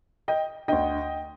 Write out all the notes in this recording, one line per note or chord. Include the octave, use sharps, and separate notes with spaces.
D#5 G5
D2 D3 D#5 G5